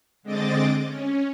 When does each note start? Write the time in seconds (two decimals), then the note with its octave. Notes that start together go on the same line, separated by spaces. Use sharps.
0.23 D3 G#3 C4 D#5 D6 A6
0.84 C#4